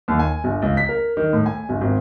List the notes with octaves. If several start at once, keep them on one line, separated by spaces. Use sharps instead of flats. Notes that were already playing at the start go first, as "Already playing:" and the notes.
D#2
G#5
G1
C#2
B6
A#4
D#3
A2
G#5
G1
G#1